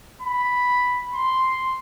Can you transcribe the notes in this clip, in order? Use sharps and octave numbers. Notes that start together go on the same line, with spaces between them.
B5
C6